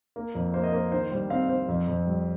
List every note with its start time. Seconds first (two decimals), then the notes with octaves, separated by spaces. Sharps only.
0.16 A#3
0.35 F2
0.54 A#3 C5
0.64 D#5
0.72 A#3 C5
0.92 D#3 C5
1.11 G3 C5
1.30 C4 F5
1.49 C4 C5
1.68 F2
1.88 F2
2.06 G3